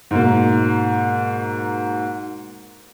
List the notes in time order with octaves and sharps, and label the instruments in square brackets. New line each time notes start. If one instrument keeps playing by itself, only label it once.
[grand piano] G#2 B2 A#3